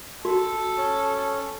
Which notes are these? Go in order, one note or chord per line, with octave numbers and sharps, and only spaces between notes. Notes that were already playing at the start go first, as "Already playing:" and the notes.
F#4 A4
C#4